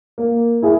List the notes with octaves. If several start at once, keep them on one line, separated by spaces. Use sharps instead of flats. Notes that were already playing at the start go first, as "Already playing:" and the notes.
A#3
E4 G#4